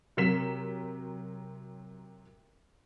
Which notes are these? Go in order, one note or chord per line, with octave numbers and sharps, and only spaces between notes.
C3 F#3 A#4 B6 E7